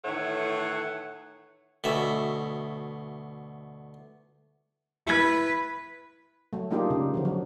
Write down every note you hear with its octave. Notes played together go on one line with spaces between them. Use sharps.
A2 D#3 E3 A3 C#5 F#5
D2 B2 E5
E4 B4 G#6
F#3 A3
G#3 A#3 D4 D#4 F4 G4
C#3
D3 F3 F#3
F#3